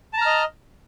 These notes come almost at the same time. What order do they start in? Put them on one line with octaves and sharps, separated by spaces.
A5 A#5 F6 D#5